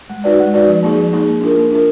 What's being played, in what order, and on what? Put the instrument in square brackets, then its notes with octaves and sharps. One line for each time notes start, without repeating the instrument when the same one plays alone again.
[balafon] G#3
D#4 F#4 B4 D5
G#3
D#4 F#4 B4 D5
F3
A#3 D#4 G#4
F3
A#3 D#4 G#4
A#3
D4 F4 A#4
A#3
D4 F4 A#4